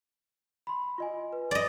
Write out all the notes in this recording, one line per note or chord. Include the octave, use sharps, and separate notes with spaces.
B5 C6
F4 D#5 G#5
B4
D5 D#5